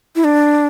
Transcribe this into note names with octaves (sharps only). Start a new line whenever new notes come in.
E4
D4